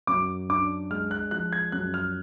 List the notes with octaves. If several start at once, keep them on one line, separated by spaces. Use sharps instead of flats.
F#2 D6
D4 D6
G#3 F6
F#6
F3 F#6
G#6
F#2 F#6
F6